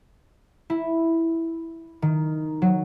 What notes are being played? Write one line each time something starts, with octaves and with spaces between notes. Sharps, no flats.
E4
D#3
F#3